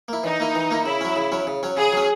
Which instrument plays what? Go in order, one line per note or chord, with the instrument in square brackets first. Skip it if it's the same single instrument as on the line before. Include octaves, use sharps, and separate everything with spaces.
[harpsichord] A#3 E4
[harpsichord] E3 [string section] D#4
[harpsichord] A#3 E4
E3
A#3 E4
[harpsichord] C#3 [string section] E4
[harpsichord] F#3 C#4
C#3
F#3 C#4
C#3
F#3 C#4
[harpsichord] C#3 [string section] G#4
[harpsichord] F#3 C#4